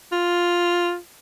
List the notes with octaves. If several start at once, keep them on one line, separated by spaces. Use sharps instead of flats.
F4